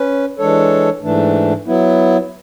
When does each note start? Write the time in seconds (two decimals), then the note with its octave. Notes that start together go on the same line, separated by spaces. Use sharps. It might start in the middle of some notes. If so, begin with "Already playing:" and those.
Already playing: C#4 B4
0.39 E3 G#3 D4 A4 C#5
1.02 G#2 E3 A3 D4
1.66 F#3 B3 E4